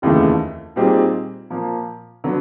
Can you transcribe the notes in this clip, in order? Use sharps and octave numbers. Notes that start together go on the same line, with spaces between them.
F1 D#2 C#3 E3 A3
A#2 G3 C4 D#4 G#4
A#2 F3 A#3
D3 F#3 B3